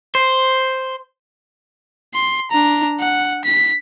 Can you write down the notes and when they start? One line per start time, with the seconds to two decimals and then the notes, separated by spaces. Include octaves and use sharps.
0.15 C5
2.14 C6
2.51 D4 A#5
3.00 F#5
3.45 B6